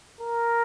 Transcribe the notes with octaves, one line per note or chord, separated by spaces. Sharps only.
A#4